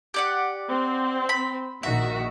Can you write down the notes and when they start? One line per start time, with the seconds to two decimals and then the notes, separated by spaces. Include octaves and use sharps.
0.14 G4 D5 F#5
0.69 C4
1.29 B5
1.83 A#1 D#3 F#4 E5